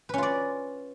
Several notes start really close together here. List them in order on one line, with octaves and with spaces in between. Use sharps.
B4 C#4 F4 D5